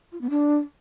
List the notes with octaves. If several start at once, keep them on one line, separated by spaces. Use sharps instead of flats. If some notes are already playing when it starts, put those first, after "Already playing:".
F4
B3
D4